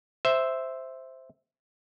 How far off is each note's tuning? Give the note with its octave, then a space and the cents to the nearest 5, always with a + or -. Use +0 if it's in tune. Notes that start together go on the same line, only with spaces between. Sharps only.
C5 +0 E5 +0